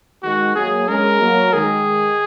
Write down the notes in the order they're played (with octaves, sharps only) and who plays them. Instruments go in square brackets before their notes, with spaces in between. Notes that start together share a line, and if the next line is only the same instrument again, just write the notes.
[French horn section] D#3 G#3 [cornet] F#4
[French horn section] F#3 A#3 [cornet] G#4
[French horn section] G#3 C#4 [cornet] A#4
[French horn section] F#3 A#3
[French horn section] D#3 G#3 [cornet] G#4